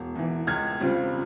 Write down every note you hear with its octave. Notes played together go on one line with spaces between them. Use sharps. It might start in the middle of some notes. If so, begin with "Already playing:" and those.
Already playing: E1
E2 E3
C#2 F6 G#6
C#3 G3 C4 F4